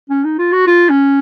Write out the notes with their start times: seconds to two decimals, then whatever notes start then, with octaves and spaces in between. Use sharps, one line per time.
0.09 C#4
0.24 D#4
0.38 F4
0.52 F#4
0.67 F4
0.89 C#4